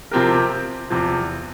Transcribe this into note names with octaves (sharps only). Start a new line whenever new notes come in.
C3 F3 C4 G4 A#4
E2 C3 F3